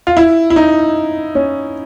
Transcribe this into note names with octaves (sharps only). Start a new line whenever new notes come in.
F4
E4
E4
D#4
C#4